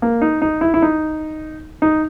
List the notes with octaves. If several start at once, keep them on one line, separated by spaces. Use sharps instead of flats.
A#3
D#4
D#4
E4
E4
D#4
D#4